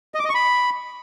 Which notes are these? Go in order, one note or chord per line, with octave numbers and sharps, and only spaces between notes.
D#5
D6
D#5
C#6
B5